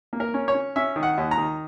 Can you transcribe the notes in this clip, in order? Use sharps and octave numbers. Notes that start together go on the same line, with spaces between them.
A#3
A#4
C#4
C#5
C#4
C#4 E5
D#3
F#5
D#2
A#5
D#3